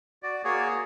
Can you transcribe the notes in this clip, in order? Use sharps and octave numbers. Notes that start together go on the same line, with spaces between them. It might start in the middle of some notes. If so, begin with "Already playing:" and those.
F#4 D5
A#3 F#4 G#4 C#5